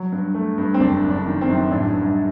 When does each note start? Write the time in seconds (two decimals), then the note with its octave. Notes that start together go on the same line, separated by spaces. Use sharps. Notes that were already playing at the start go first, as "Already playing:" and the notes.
Already playing: F#3
0.12 G2
0.35 A3
0.58 G2
0.74 C4
0.80 F#1 D4
1.04 F#1
1.10 D4
1.26 D#3
1.41 C4
1.49 F#2
1.71 A1 D4
1.94 G2